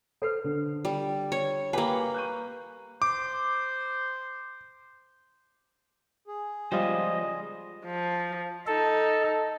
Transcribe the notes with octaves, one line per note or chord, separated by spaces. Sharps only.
A4 B4 C5 C7
D3
G3
C#5
A#3 G4 B4 G#5 B5
A#5 C#6 F#6 G6 D#7
C5 D6
G#4
F3 G3 G#3 F4 C5 D#5
F3
D#4 A4